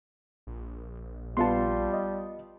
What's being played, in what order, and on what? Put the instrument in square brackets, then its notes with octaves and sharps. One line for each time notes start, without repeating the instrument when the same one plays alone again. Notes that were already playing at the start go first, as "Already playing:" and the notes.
[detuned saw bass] A#1
[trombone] G3 [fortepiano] B3 F4 [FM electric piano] A5 C6
[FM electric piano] D#5